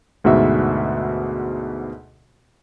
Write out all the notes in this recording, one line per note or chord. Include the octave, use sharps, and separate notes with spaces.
D2 G#2 B2 F#4 E5